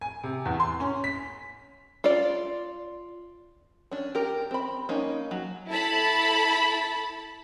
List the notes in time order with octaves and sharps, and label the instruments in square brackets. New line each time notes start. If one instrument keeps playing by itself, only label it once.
[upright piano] G#5
C3
E2
C6
C#4
B6
[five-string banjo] F4 D5
C#4 D4
G4 A#4
C4 B5
A#3 C#4 D#4
F#3
[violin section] E4 A4 A5 B5